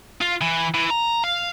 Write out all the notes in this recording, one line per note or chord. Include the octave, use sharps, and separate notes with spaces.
F4
E3
E3
A#5
F5